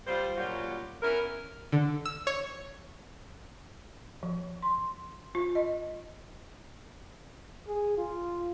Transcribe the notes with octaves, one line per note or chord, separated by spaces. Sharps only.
G3 F4 C5
A#2 F#3 G3 C#4 F4 F#4
B3 C#4 E4 A#4
D3
E6
C#5
F3
C6
F4
D#5
G#4
F4